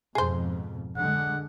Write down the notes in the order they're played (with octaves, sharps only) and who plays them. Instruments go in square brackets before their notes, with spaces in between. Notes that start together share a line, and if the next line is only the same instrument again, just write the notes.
[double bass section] F2 G#2 B2 [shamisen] G#4 C5
[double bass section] D3 G#3 [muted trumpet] F#5